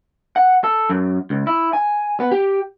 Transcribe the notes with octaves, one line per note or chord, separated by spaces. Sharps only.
F#5
A4
F#2
C#2
E4
G#5
B3
G4